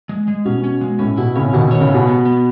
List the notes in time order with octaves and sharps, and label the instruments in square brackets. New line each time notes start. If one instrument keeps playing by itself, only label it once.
[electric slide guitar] G#3
G#3
[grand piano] B2 [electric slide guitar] C#4
[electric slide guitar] C#4
G#3
[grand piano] A2 [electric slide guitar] C#4
[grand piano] B2 [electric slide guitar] E4
[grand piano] A2 C#3 [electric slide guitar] C#4
[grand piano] B2 D#3 [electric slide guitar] E4
[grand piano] B2 D#3 [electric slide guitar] C#5
[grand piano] A2 C#3
[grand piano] B2 [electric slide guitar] B3
[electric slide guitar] B3
B3